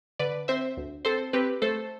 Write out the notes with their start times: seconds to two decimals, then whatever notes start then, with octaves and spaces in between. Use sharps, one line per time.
0.19 D3 B4 D5
0.48 C4 C5 E5
0.77 D2
1.05 C4 A4 C5
1.33 C4 G4 B4
1.62 A3 A4 C5